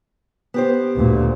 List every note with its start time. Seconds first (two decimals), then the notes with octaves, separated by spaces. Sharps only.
0.54 B3 G4 C5
0.95 D2 A#2